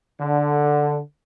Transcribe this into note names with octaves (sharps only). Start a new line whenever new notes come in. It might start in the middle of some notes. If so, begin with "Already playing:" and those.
D3